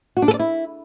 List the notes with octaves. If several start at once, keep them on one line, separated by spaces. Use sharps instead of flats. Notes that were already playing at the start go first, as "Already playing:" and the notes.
F#4
D4
A4
D5
E4